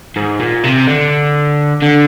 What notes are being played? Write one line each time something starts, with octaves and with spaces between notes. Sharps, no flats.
G#2
A#2
C3
D3
D3